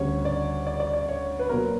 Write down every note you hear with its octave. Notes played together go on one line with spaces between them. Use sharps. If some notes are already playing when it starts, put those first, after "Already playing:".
Already playing: D2 C#3 G3 C#4 C#5
D5
D5
D5
D5
C#5
B4
A#2 F#3 B3 A#4